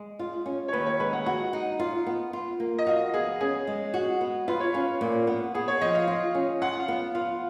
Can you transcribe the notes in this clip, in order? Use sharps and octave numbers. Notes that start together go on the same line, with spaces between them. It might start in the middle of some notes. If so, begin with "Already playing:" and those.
Already playing: G#3
F4
C#4
C#5
D#2 B4
C#5
G#3 B4
F#5
F#4 F#5
D#4
F4
B3
F4
A#3
D#5
F#4 F5
B3 G#4
C#4 G#4
G#3
F#4
B3
F4 B4
C#5
C#4 F5
F5
A#2
B3
B3 G#4
C#5
F3 D#5
F5
F4
C#4
F4 F#5
F5
B3
F4 F5